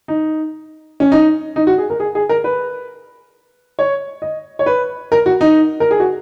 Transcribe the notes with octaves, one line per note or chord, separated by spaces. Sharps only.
D#4
C#4
D#4
D#4
F#4
G#4
A#4
G#4
G#4
A#4
B4
C#5
D#5
C#5
B4
A#4
F#4
D#4
A#4
G#4
F#4